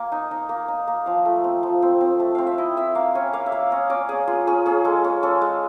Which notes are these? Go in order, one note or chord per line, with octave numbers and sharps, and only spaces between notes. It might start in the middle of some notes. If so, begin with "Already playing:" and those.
Already playing: A#3 G#5
D#4
D#4
A#3
D#4
A#3
F3 F5
A3
C4
F3
C4
C4
A3
C4 F5
E5
E4 D#5
E4 E5
A#3 F5
C#4 G#5
A#3 F5
E5
A#3 F5
C#4 D#5
C#4 D5
C#4 G#4
F4 G#4
C#4 G#4
C#4 G#4
G#3 A4
C#4
C#4 A4
G#3